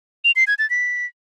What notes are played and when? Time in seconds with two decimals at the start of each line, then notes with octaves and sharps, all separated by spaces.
0.24 F7
0.36 C7
0.47 G#6
0.59 A6
0.70 B6